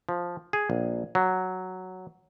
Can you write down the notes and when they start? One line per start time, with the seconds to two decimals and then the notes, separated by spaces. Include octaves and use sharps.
0.09 F3
0.53 G#4
0.70 A#1
1.15 F#3